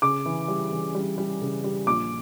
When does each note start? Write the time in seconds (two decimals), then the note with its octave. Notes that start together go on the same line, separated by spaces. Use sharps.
0.02 C#3 D6
0.25 E3
0.48 G3
0.72 E3
0.95 G3
1.18 G3
1.41 C#3
1.64 G3
1.87 A#1 D6